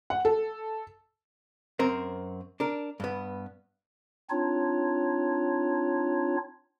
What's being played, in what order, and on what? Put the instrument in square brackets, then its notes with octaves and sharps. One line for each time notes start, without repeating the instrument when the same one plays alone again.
[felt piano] F#5
A4
[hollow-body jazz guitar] F#2 C4 A#4 C5
D4 A#4
G2 B3
[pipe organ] C4 D4 D#4 F4 C#5